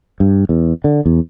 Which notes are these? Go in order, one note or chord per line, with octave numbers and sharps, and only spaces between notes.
G2
E2
D3
E2